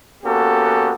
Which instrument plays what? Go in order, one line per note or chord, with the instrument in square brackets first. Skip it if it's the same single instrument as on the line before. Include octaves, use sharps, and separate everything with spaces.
[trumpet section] A#3 B3 C#4 F#4 G4 A4